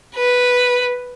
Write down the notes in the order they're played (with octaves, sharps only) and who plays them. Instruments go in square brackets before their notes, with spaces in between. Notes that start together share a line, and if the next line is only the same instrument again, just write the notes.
[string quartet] B4